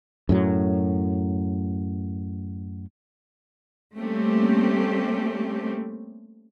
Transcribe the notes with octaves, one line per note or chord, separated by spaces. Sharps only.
F#2 A2 F#3
G3 A3 A#3 C4 C#4 G4